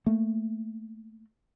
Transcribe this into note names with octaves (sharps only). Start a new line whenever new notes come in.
A3 A#3